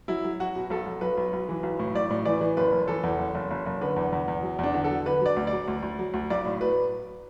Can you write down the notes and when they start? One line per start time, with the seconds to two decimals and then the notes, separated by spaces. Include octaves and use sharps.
0.08 F#3 E4
0.24 F#3
0.40 F#3 F#4
0.56 B2
0.70 B1 A4
0.86 B1
1.01 B1 B4
1.17 B1
1.33 B1
1.49 E3
1.63 B1
1.79 A2
1.95 B1 D5
2.10 A2
2.26 E3 D5
2.41 E3
2.57 F#1 B4
2.72 F#1
2.88 E3 A4
3.03 E2
3.19 F#1
3.35 F#1
3.51 F#1
3.66 F#1
3.81 D3 B4
3.96 E2
4.12 E2
4.28 E2
4.43 F#3
4.59 E2 D4
4.74 D3
4.84 A4
4.91 F#3
5.06 D3 B4
5.21 F#3 D5
5.37 D2
5.47 D5
5.53 F#3
5.68 D2
5.83 D2
5.99 F#3
6.14 D2
6.30 B1 D5
6.45 A2
6.60 F#3 B4